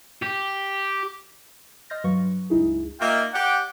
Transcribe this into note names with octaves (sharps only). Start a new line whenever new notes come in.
G4
D#5 C6 F6 G6 A6 A#6
G2 F#3 B4 F5 C#6
C#2 G2 D#4 E4 G#4
A#3 D#4 F4 E5 G5
G4 D5 F#5 G5